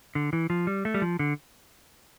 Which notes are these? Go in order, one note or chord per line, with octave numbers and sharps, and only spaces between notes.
D3
E3
F3
G3
A3
G3
F3
D3